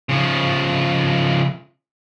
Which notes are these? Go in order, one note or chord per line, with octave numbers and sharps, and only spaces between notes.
C#3 F3